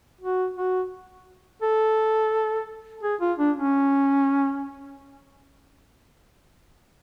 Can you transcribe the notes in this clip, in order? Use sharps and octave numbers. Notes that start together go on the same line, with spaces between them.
F#4
F#4
A4
G#4
F4
D4
C#4